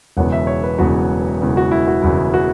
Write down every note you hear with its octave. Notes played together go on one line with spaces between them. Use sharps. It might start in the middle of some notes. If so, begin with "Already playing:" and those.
E1 E2 C#3 F#3 B3 F#5
E5
C#5
B4
E1 E2 C#3 F#3 B3 F#4
E1 E2 C#3 F#3 B3
F#4
E4
F#4
E1 E2 C#3 F#3 B3 E4
F#4